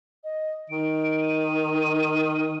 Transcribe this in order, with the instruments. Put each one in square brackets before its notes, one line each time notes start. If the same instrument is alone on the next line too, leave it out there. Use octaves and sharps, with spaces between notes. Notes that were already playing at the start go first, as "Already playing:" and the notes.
[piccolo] D#5
[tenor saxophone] D#3 [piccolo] D7
[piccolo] D#7